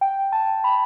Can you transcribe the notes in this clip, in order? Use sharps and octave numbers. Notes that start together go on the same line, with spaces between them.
G5
A5
B5